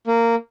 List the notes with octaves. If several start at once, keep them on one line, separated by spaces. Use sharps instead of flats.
A#3